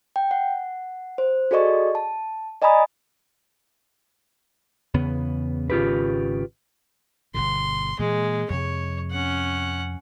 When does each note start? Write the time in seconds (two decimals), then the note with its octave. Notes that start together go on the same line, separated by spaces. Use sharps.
0.16 G5
0.31 F#5
1.18 C5
1.51 F#4 G#4 A4 D5 D#5 C#6
1.95 A5
2.62 D5 D#5 G#5 A#5 B5 D#6
4.94 E2 C#3 B3
5.70 G#1 C#3 F4 G4 B4
7.34 G1 B2 D3 C6
7.99 A#2 E3 G#3 A#3
8.50 F2 C3 C#5
9.11 C#4 F#5